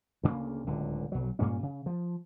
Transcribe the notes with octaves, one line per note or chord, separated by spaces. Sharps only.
D2 C#3 A#3
D1 C#2 D3
B1 F#3
G2 A#2 A#3 C#4
C#3
F3